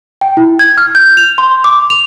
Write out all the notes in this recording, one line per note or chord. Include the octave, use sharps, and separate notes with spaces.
G5
E4
G#6
F6
G6
F7
C6
D6
F7